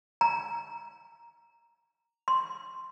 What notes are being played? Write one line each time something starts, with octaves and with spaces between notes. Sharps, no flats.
A#5
C6